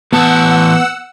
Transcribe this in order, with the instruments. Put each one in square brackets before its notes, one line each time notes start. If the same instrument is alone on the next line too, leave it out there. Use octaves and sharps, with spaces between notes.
[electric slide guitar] A2 E3 A5 [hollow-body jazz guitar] B3 [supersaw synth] F#5 E6